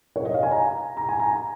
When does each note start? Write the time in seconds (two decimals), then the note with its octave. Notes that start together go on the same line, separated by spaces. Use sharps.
0.16 C#5
0.25 D#5
0.34 F5
0.43 G#5
0.51 A#5
0.97 A#5
1.09 G#5
1.19 A#5